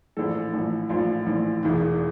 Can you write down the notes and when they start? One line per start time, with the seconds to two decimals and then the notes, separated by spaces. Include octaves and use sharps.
0.17 A#1 A2 E3 A4
0.53 A#1 A2 E3
0.89 A#1 A2 E3 F4
1.26 A#1 A2 E3
1.63 E1 E2 E3